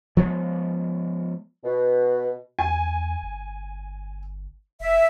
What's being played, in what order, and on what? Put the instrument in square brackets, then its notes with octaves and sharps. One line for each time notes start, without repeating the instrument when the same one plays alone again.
[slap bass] F3 G#3 B3
[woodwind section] B2
[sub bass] E2 [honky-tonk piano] G#5
[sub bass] G1
[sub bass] F1 [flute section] E5